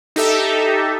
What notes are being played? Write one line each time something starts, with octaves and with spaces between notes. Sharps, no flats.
D#4 G4 A4 E5